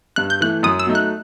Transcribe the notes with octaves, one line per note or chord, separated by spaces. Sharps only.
G2 F#6
G6
E3 A3 F#6
F#2 D#6
E6
F#3 A3 D#4
F#6